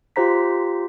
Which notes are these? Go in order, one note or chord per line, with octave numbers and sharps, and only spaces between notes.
F4 G4 C5 A#5 B6